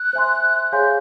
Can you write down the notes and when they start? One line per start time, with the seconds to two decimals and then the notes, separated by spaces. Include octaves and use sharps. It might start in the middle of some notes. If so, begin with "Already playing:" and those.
Already playing: F#6
0.13 C5 E5 G#5 C6
0.72 G#4 C#5 F5 G#5 C6 G6